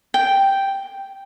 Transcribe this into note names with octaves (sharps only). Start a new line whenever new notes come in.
G5